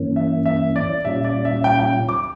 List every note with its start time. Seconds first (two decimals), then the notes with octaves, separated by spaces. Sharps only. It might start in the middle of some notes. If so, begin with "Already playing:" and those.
Already playing: G2 E3 A#3 C#4
0.16 E5
0.46 E5
0.76 D5
1.05 A#2 G3 C#4 F4 E5
1.25 D5
1.45 E5
1.64 G5
1.79 G5
2.09 D6